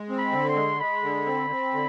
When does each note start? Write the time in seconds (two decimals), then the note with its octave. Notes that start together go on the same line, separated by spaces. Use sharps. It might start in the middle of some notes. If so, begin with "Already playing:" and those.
Already playing: G#3
0.09 C4
0.18 B5
0.32 D3
0.48 C6
0.56 G#3
0.80 G#3 B5
1.03 D3
1.26 C4
1.50 C4
1.73 D3